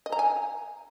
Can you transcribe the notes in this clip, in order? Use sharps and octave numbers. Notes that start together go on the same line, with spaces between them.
D#5
A#5
G#5